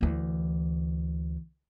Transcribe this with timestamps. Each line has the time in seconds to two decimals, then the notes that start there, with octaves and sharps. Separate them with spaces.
0.01 D2 E3